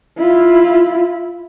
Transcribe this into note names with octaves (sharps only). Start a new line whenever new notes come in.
E4 F4